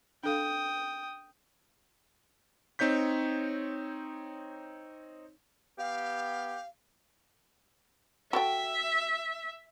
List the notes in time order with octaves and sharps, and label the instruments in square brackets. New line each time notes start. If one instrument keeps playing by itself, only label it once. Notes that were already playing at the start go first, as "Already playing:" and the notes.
[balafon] D4 A4 F5 [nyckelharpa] G5 D#6
[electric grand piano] C4 D#4 C#5 G6 B6
[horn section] B3 G4 [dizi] F5
[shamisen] F#4 A4 G5 [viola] E5